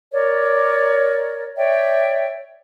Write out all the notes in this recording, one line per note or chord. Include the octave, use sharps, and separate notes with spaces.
A#4 C#5 D5
C#5 D5 E5 G5